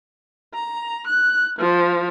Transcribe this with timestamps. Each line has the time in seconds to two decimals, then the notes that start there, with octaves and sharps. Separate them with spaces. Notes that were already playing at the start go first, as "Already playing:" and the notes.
0.55 A#5
1.08 F#6
1.59 F3